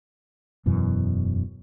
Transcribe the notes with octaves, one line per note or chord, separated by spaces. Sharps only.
E1 F#2 B2 E3